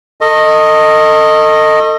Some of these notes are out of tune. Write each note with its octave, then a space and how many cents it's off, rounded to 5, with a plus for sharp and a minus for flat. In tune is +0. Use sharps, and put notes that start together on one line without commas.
A4 +35 D#5 +0 C#6 -40